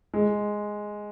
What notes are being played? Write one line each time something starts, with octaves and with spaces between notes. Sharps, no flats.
G#3